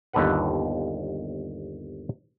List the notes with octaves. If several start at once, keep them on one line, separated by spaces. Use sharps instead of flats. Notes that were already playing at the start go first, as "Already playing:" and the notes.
G1 D#2 A4 B4 F#5